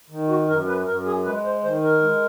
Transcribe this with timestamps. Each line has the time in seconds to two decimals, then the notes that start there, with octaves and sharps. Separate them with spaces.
0.10 D#3
0.29 F#4
0.48 F#2 A#4
0.68 B4
0.86 F#2 A#4
1.06 G#4
1.25 G#3 B4
1.45 C5
1.63 D#3 C5
1.83 A#4
2.02 G#3